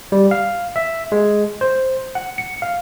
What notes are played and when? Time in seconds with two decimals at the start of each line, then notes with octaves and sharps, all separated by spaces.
0.12 G3
0.31 F5
0.76 E5
1.12 G#3
1.61 C5
2.15 F#5
2.38 C#7
2.62 F5